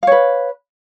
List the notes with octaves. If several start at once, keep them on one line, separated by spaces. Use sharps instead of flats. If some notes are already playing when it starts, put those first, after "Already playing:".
B4 C#5 F5